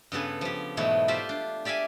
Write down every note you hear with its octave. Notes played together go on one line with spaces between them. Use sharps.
G2 C#3 B3 A4 G#5
F3 G4
G#2 B2 E3 F#3 A3
F4 G4 C5 D5 E5
D4
G4 D5 E5 F5 G#5